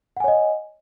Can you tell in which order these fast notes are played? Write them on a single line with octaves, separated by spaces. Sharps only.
F#5 G#5 C#5 D#5